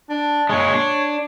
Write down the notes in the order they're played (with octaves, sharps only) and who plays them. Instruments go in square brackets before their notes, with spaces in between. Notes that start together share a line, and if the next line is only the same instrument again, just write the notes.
[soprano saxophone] D4
[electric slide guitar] A#2 G#3 [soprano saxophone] C#5
[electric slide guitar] D4